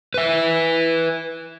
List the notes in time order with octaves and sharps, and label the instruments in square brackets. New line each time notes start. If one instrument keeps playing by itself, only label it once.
[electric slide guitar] B4 E5